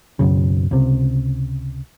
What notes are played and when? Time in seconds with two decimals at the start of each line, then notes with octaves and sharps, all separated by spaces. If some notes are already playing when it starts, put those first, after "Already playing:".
0.19 F#1 B1 F#2 C#3
0.71 C#2 C3